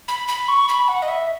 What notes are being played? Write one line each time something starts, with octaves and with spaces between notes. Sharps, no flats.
B5
B5
C#6
B5
F#5
D#5
E5